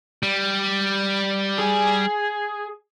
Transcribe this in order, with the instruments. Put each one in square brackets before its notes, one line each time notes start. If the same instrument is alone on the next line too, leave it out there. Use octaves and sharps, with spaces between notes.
[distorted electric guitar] G3
[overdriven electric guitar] G#4